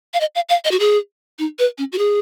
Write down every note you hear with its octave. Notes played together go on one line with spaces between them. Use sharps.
F5
D#5
F5
F5
D#5
F#4
G#4
D#4
B4
C#4
F#4
G#4